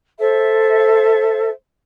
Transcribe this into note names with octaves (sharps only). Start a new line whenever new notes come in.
A4 C5 E5